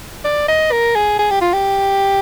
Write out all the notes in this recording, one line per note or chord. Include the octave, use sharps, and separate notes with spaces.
D5
D#5
A#4
G#4
G#4
G4
F4
G4